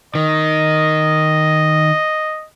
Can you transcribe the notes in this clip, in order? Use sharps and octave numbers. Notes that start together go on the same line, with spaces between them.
D#3 D#5